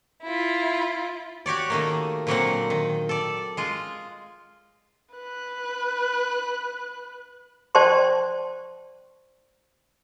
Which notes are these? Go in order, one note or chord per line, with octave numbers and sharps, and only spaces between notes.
E4 F4
F#4 G4 C#5 D5
D#3 A3 A#3
A#2 D3 F#3 A#3 C4 F#5
D#3
A4 D5
G#3 F4
B4 F#6
C5 D5 G5 A5 C6 C#6